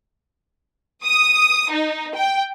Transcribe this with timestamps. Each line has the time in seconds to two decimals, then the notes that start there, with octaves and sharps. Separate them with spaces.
1.04 D#6
1.70 D#4
2.15 G5